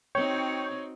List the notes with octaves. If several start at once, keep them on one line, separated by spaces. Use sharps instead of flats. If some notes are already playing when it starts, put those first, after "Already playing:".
C4 D#4 F#4 C#5 G5 C#6